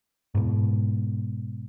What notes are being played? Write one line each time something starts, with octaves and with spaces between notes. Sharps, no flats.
G#2 B2